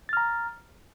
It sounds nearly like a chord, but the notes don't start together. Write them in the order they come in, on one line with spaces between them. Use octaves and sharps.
A6 F6 A#5